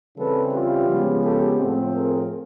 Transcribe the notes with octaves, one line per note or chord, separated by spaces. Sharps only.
C#3 E3 G3 C4 A4 B4
F4 G4
C#3 F3 G#3 B3
G4 A4
A2 F3 A3 C4
G#4 A#4